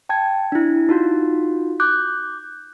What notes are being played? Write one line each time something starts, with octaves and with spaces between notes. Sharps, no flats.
G5 A5 G#6
D4 E4
D#4 F4 F#4
D6 F#6 G6